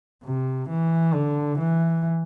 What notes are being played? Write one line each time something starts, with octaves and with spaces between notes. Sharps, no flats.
C3
E3
D3
E3